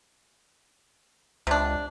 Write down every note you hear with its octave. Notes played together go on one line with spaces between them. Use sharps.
C#2 C3 D4